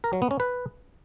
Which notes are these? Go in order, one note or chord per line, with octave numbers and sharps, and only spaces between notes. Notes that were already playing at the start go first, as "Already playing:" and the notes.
A#4
F#3
B3
C#4
B4